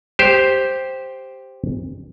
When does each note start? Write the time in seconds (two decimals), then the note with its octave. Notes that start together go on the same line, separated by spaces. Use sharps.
0.19 G4 C5